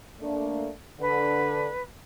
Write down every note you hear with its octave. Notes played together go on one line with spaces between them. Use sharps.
A3 A#3 D4
D3 B4